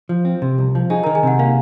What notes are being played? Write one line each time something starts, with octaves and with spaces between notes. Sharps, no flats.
F3
C4
C3
C2
F3
D#4 G#4 G#5
D#3 A#4 A#5
G#4 G#5
C3 F#5
A#3 F5